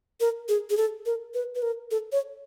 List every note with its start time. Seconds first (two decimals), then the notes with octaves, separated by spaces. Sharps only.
0.20 A#4
0.49 G#4
0.70 G#4
0.77 A4
1.06 A#4
1.34 B4
1.55 B4
1.62 A#4
1.91 A4
2.12 C#5